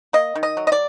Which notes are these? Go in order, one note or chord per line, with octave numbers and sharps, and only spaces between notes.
A#3 D#5
D#3
D#5
F#3
D#5
D5